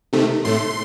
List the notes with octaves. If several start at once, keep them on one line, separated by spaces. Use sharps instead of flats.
C3 D#3 A3
A2 A3 C6